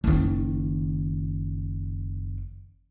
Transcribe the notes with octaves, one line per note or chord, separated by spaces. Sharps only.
F#1 D#3